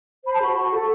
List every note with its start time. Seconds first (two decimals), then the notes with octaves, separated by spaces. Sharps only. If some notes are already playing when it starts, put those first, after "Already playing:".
0.25 C5 B5
0.32 A5
0.40 F#4 B5
0.57 F#4
0.73 A4